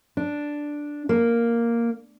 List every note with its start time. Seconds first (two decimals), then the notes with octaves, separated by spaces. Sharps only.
0.17 D4
1.09 A#3